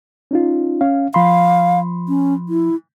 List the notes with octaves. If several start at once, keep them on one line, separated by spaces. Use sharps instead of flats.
C#4 D#4 F4
C#4 F5
F3 F5 B5 C6
C#4
E4